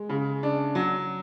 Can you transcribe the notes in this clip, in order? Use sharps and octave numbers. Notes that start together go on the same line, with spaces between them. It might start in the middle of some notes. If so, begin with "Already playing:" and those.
Already playing: G#3
C#3
D4
F#3